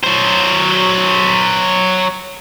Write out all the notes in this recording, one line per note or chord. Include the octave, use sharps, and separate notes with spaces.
F#3 C5